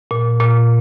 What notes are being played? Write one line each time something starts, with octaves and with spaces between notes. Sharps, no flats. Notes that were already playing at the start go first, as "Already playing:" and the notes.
A#2
A#2